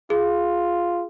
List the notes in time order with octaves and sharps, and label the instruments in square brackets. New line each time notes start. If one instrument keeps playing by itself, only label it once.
[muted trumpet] F4 [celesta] G#4